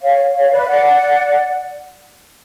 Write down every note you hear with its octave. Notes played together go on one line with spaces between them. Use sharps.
C#5 F5
C#5 F5
B4 D5
F5
D5 F#5